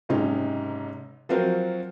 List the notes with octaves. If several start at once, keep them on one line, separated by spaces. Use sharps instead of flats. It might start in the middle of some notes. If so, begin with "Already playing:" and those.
F#1 G#2 C3 C#4 D#4
F3 F#3 C4 F#4 A#4 C5